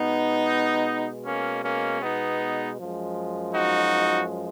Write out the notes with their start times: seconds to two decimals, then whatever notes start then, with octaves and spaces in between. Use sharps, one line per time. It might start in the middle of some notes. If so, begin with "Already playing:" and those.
Already playing: B2 G#3 B3 D#4
1.25 A#3 C#4
1.63 A#3 C#4
2.01 B3 D#4
2.78 F#2 F3 G#3
3.54 D#4 F#4